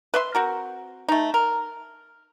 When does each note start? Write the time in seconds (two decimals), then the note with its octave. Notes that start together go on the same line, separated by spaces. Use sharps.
0.14 B4 E5 C6
0.35 C4 F#4 A#4
1.08 A3 D#4
1.34 A#4